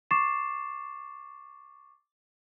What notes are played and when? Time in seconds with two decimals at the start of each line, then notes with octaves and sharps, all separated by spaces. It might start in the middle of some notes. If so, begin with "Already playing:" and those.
0.11 C#6 D6 A6 C7 E7